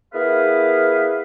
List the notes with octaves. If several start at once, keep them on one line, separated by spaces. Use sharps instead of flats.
B3 E4 G#4 A#4 B4 F5